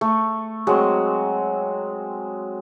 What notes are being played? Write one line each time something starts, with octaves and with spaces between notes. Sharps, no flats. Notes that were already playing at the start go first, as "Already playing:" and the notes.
A3
F#3 G#3 C4